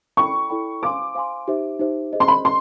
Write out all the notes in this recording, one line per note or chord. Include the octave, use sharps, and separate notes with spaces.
E4 A4 D5 G5 B5 C#6
E4 A4 D5 G5 B5
C5 F5 G#5 C6 D6
C5 F5 G#5 C6
D#4 G4 C5 E5
D#4 G4 C5 E5
G#4 C5 D#5
C6
B5
D#5 C6